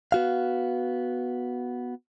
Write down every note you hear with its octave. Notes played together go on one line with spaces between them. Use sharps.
B3 F#4 F5